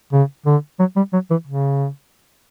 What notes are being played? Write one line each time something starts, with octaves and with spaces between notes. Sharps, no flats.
C#3
D3
F#3
G3
F#3
E3
C#3